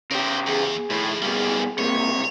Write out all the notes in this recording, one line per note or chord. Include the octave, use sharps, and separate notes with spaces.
C#3 G4 A#4 C5
E2 G#4
A2 D#3 F3
G2 B2 A#3 C#4 G#4
C#2 C3 A#3 C#5